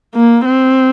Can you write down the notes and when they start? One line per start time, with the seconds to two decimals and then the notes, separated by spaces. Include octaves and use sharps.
0.15 A#3
0.45 C4